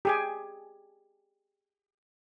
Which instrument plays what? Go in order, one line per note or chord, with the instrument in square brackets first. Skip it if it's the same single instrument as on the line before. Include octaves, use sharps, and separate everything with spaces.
[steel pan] G4 G#4 G#5